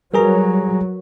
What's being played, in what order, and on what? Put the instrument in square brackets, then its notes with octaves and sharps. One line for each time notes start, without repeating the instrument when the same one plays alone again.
[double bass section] F#3 [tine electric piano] G3 G#4 A#5 [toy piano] A#4 B4